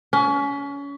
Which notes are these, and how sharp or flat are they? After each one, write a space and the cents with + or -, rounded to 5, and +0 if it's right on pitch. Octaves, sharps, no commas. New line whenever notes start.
C#4 +30